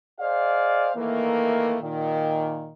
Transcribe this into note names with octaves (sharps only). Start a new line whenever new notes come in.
G#4 C5 D5 D#5 F5
D#3 E3 A3 A#3
A#2 D#3